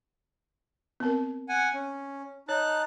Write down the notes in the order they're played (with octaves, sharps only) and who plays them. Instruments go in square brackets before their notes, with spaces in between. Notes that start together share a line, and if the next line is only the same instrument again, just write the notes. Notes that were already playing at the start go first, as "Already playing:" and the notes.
[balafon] B3 C4 A#4
[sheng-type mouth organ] F#5 G#5
C#4
[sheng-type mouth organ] D#4 A5 F#6 [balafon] C#5